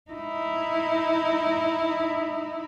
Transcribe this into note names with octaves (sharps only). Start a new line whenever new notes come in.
D#4 E4